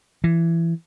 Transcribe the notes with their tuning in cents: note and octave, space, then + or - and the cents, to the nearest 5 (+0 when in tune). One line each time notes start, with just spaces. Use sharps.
E3 +20